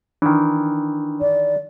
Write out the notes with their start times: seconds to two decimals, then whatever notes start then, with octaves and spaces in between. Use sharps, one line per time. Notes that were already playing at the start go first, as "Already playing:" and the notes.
0.22 D#3 E3 D4
1.21 D5